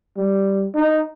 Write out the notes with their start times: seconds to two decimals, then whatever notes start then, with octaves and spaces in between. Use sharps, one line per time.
0.17 G3
0.75 D#4